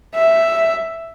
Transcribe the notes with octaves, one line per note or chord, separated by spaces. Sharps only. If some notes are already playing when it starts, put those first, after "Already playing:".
E5